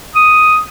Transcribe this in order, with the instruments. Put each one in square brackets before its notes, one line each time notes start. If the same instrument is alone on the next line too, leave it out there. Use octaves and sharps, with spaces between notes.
[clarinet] D#6